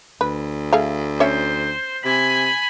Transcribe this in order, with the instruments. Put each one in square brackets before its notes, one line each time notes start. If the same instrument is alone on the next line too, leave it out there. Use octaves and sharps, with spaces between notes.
[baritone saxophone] D2 [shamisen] B4
[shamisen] A3 G#4 F5
[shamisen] C#4 C#5 E5 [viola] C5
[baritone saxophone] C3 [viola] G#5 B5